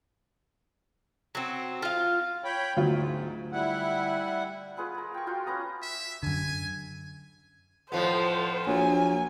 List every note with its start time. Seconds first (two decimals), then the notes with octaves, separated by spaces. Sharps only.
1.35 F#3 C4
1.82 F4 F5
2.44 C#5 G5 B5
2.77 D2 G#2 F#3 F4
3.52 G3 E4 F#5
4.77 F4 G#4 B4 F#5
4.95 G#4 A#4
5.14 G5 C#6
5.27 F4 F#4 G5 C6
5.46 C#4 B4 A#5 D#6
5.82 E5
6.23 F#2 D3 G#5
7.92 F2 A2 F3 B3 C5
8.67 A#1 F#3 G#5